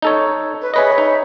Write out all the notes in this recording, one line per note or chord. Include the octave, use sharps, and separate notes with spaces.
D#4 A4 C#5
B4
G#4 B4 C#5 D#5 E5 B5
D#4